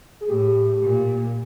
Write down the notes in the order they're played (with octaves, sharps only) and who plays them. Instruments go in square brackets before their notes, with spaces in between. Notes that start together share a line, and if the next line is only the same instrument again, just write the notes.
[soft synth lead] G#4
[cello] A2 [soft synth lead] G4
[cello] A#2